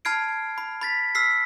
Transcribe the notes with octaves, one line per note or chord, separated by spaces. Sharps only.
A5 B5 F6 G#6 C7 D7
B5
B5 A6 B6
E6 F6 B6 C7